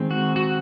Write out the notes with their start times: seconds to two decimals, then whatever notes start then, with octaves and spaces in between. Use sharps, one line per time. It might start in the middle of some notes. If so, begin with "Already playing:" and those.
Already playing: D#3 G#3 C4
0.11 F#4
0.36 F#4